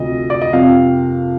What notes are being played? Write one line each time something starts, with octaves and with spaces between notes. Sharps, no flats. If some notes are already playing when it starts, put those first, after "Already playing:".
Already playing: D2 C3 F3 D#5
D5
D#5
F2 C3 F3 A#3 F5